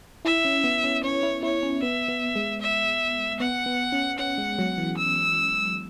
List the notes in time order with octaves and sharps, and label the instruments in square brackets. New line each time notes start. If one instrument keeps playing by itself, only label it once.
[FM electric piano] E4 [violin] E5
[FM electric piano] C#4
B3
C#4
[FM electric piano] C#4 [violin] C#5
[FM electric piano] E4
[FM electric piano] E4 [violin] C#5
[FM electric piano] C#4
[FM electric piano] B3 [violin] E5
[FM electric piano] B3
G#3
[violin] E5
[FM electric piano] B3 [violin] F#5
[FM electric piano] B3
C#4
[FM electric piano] C#4 [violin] F#5
[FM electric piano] G#3
F#3
E3
[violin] E6